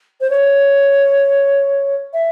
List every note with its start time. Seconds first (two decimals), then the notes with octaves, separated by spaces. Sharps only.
0.20 C5
0.30 C#5
2.13 E5